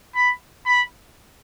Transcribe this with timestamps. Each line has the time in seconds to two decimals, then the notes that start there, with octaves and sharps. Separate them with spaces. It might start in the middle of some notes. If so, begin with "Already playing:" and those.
0.16 B5
0.66 B5